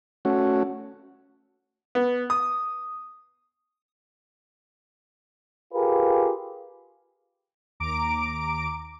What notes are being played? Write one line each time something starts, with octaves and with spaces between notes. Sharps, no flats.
A3 C#4 F#4
B3
D#6
F4 G4 G#4 A#4 B4
D#2 A#5 D6 D7